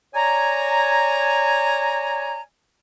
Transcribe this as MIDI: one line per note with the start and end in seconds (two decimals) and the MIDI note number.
0.15 2.40 73
0.15 2.40 74
0.15 2.40 80
0.15 2.40 82